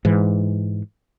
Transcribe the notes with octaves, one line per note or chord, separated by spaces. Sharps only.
G#2 E3